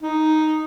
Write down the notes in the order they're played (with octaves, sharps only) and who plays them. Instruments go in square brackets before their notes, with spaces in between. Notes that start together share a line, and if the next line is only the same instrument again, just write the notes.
[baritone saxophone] D#4